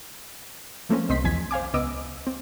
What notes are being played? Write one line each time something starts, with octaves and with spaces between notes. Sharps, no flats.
F3 A3 A#3 C4 C#4
C2 C4 D#5 C6 B6
B1 E2 F3 G#5 G#6 B6
C5 F5 G#5 D6
C#2 B3 D#5 D6 E6
C4